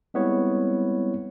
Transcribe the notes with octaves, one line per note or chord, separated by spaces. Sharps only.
G3 G#3 B3 C4 E4 C#5